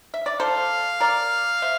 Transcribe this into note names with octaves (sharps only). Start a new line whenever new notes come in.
E5
D5
A4 C5 F5
A#4 D5
C5 E5